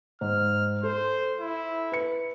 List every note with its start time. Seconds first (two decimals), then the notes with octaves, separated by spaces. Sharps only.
0.21 G#2 F6
0.83 A4 C5
1.40 E4
1.92 B4 C#7